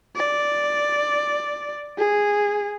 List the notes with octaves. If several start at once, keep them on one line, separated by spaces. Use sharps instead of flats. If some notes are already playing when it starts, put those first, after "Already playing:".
D5
G#4